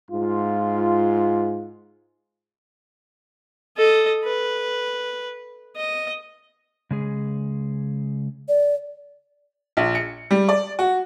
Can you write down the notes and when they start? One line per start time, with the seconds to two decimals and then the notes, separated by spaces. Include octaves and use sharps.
0.11 G#2 F4
3.77 A4 D#5
4.24 B4
5.76 D#5
6.91 C#3 G#3 G#4
8.48 D5
9.77 A#1
9.95 C#7
10.31 G3
10.49 D5
10.79 F#4